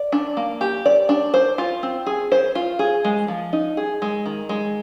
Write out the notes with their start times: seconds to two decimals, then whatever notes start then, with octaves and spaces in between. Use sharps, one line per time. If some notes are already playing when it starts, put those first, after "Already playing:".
Already playing: D5
0.12 D4
0.37 A#3
0.61 G4
0.86 D5
1.09 D4
1.34 C5
1.58 F4
1.83 C4
2.06 G#4
2.32 C5
2.55 F4
2.79 G#4
3.05 G#3
3.28 F3
3.53 D#4
3.77 G#4
4.02 G#3
4.26 D#3
4.49 G#3